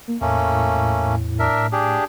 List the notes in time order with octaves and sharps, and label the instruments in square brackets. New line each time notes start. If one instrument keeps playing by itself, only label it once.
[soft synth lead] A#3
[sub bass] E2 [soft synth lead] A2 [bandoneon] A3 A#3 C#4
[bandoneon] D4 A#4 E5
D4 G4 G#4